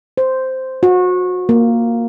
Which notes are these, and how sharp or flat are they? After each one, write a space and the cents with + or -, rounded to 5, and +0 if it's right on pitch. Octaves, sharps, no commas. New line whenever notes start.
C5 -5
F#4 -30
A#3 +0